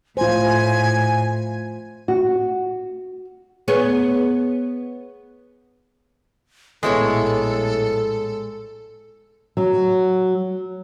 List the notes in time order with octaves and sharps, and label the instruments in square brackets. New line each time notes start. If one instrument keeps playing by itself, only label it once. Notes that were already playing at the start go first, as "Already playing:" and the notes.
[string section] A2 [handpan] F4 C5 [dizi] G#5
[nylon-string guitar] F#4
[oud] B3 G#4 C#5
[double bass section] A#1 A2 [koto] G#3 [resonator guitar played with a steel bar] B3 E4 C#5 [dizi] A4
[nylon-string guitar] F#3